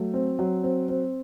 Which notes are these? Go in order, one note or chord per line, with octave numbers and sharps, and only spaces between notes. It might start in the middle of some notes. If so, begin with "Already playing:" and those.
Already playing: F#3 A3
C4
F#3
C4
C4